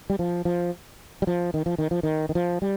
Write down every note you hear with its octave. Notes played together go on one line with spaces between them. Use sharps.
G3
F3
F3
G3
F3
D#3
F3
D#3
F3
D#3
D#3
F3
G3